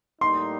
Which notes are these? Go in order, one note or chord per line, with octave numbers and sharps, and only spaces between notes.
A2 G3 A#3 D#4 C6